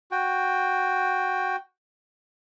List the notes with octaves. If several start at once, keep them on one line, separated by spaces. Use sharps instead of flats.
F#4 G5